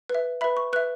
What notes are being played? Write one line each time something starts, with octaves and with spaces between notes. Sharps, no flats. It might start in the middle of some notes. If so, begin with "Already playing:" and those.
B4
E5
B4 E5 B5
C#6
B4 E5 F#6